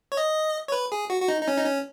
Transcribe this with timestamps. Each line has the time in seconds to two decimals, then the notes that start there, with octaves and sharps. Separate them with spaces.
0.12 C#5
0.17 D#5
0.68 C#5
0.72 B4
0.92 G#4
1.10 F#4
1.22 F#4
1.28 D#4
1.41 D#4
1.48 C#4
1.57 D#4
1.66 C#4